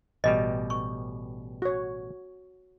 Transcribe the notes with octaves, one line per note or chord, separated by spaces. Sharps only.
A1 B2 G3 D#5
C#6
F#4 C#5